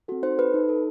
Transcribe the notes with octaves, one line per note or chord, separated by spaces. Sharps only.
C4 F#4 A4
D#4 C5
A4 B4
D#4
A4